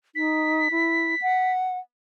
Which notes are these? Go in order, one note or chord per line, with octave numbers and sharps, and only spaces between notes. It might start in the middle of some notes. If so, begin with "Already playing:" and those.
D#4 B6
E4
F#5